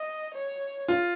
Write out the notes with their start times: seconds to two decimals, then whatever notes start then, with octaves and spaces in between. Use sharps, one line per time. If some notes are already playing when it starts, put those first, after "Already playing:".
Already playing: D#5
0.34 C#5
0.88 F4